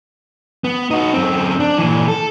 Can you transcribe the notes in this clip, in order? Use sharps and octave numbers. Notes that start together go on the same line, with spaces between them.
B3
D#4 F#4
F#2 C4
D4
A#2 E3
A4